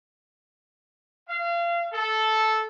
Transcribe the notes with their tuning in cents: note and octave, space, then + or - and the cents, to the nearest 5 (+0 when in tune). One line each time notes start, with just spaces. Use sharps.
F5 -30
A4 -10